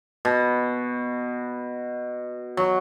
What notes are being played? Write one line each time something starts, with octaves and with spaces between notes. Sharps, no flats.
B2
F#3